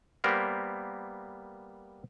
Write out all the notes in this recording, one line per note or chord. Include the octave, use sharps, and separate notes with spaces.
G3 A#3 B3 A#4 C5